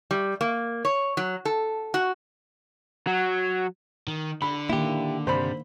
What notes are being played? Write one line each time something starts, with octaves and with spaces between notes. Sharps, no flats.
G3
A#3
C#5
F#3
A4
F#4
F#3
D#3
D3 B5
D#3 A#3 E4 G4
G2 C3 G3 C5 B5